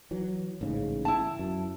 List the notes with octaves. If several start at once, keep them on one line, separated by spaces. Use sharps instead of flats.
E3 F#3
A1 G#2 C#3
E4 A5
F#2